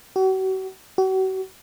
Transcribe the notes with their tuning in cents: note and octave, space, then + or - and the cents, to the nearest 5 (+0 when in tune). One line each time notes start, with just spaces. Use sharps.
F#4 +40
F#4 +40